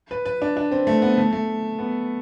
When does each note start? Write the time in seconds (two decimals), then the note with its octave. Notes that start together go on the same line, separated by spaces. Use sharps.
0.11 B4
0.26 B4
0.42 D4
0.57 D4
0.71 C4
0.87 A3
1.02 B3
1.18 A3
1.33 A3
1.79 B3